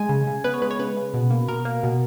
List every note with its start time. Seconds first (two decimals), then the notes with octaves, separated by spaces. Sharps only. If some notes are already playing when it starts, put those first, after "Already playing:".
Already playing: G#3 G#5
0.09 C#3
0.27 C#3
0.44 B3 B4
0.54 C#5
0.62 G#3 B4
0.71 C#5
0.79 C#3 B4
0.97 C#3
1.14 B2
1.31 A#3
1.48 B2 A#4
1.65 A#3
1.83 B2